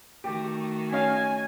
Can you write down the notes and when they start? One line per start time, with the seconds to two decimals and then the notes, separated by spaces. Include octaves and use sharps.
0.24 D#3 A3 F#4 G4
0.93 C#4 D#5 F5 G#5